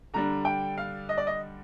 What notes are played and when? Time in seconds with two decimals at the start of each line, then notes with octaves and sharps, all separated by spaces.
0.14 D3 G3 D4 A#5
0.45 G5
0.78 F5
1.09 D#5
1.17 D5
1.27 D#5